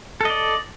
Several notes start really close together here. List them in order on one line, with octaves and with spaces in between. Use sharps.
A4 D#5 D5